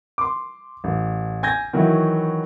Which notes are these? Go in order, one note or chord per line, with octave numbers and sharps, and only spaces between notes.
C6 D6
A1
G#5 G6 G#6 A#6
D#3 E3 F#3 E4 F#4